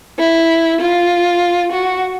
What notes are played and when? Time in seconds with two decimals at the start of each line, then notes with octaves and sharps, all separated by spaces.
0.19 E4
0.80 F4
1.72 F#4